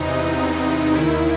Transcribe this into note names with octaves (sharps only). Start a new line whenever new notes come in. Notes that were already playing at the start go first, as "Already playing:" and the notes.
Already playing: E2 C3 E3 D#4
D#2 D#3 E4